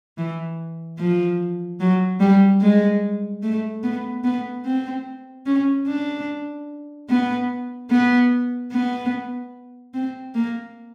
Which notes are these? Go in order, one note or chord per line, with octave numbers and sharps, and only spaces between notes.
E3
F3
F#3
G3
G#3
A3
B3
B3
C4
C#4
D4
B3
B3
B3
C4
A#3